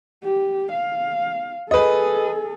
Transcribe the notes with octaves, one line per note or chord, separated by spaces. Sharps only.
G4
F5
G#4 A4 B4 D#5